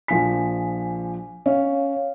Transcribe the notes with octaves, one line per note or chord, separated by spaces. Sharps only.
A#1 F3 G#5 B6
C#4 C#5 F5